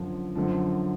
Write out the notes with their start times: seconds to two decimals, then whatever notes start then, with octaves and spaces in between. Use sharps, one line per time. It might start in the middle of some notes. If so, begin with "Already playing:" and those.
Already playing: F#2 D3 F3
0.35 F#2 D3 F3